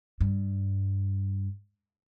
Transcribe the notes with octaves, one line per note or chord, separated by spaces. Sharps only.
G2